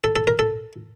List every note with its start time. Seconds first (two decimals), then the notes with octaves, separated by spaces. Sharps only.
0.04 A4
0.16 A4
0.27 A#4
0.39 A4